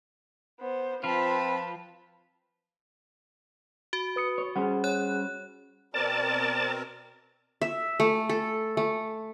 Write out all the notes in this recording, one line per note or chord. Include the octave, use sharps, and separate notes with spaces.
B3 C5
F3 C4 F4 B4 A5 B5
F#4
B4 D#6 C#7
C#5
G3 C#4 G#4 C5 F#5
C#5 F#6
B2 C4 A#4 D5 A5
E5
A3
A4
A3